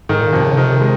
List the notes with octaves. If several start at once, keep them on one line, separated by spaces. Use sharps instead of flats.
G#2 D#3
A#2
F2 C3
C#3
C3 D#3
G#3